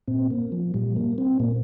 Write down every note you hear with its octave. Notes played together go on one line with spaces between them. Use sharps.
A#2 C4
A#3
F3
A#2 G3
A#3
C4
A#2 A#3